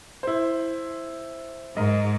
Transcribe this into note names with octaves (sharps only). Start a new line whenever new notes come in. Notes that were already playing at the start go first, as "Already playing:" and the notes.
E4 C5
G#2 A#4 D#5